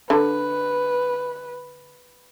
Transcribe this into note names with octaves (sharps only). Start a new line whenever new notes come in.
D3 B4